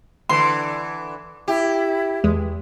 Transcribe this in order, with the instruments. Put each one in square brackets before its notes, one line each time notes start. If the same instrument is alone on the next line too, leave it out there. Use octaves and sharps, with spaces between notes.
[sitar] D3 E3 [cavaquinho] C6
[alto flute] E4 [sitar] G4
[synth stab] E2 G#3